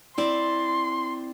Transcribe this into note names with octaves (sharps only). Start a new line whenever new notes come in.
C4 E4 D5 C6